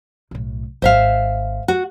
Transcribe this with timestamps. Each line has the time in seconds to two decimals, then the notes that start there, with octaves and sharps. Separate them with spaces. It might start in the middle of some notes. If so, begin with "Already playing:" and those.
0.31 B1 A2
0.82 G#1 C5 E5 F5
1.68 F#4